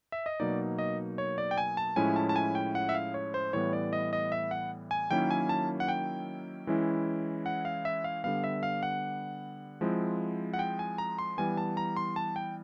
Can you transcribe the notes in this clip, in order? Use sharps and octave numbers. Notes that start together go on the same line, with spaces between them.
E5
D#5
B2 F#3 A#3 D#4 D5
D#5
C#5
D5
G5
G#5
A5
A2 F3 G#3 C#4 E4 G#5
A5
A5
G#5
G5
F#5
E5
F5
C#5
C5
A2 E3 G3 B3 C#5
D5
D#5
D#5
E5
F#5
G#5
D#3 F#3 A#3 C#4 E4 G5
G#5
A5
F#5
G5
E3 G#3 C#4 E4
F#5
F5
E5
F5
D3 G3 B3 F5
E5
F5
F#5
F3 G#3 C4 E4
F#5
G5
G#5
A#5
C6
E3 G3 B3 G#5
A5
A#5
C6
A5
G5